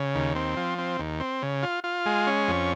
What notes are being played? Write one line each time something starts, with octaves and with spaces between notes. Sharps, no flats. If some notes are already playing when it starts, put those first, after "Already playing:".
Already playing: C#3
D#2
C4
F3
C4
D#2
C4
C#3
F4
F4
G#3
C#4
F2